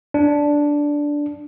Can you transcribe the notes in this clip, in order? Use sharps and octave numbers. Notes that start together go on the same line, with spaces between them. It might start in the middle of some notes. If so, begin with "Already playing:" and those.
D4